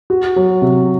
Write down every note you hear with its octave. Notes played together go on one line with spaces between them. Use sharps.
F#4
F#3
C3